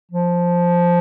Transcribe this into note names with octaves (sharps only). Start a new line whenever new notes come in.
F3